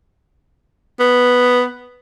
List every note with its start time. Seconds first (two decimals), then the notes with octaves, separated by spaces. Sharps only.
1.00 B3